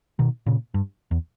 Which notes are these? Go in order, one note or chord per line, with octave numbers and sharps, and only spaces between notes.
B2 D#3
A#2 C#3
G2
E2